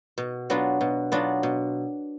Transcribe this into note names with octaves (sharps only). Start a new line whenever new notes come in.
B2
F#3 B3 D4 F4
B2
F#3 B3 D4 F4
B2